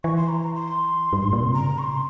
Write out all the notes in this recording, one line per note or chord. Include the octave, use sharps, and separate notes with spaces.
E3 C#6
C6
A#5
A#5
C6
G2
G#2
A#2
C3
C#3 A#5
C#6
C6